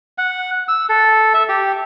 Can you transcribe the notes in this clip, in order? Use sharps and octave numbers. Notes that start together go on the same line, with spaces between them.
F#5
E6
A4
E5
G4